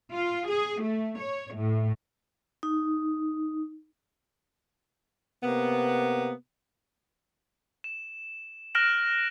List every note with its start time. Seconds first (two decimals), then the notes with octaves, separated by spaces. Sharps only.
0.13 F4
0.48 G#4
0.82 A3
1.20 C#5
1.55 A2
2.63 D#4
5.43 C3 A#3 B3
7.84 E7
8.75 F6 F#6 A#6 D7 E7 F#7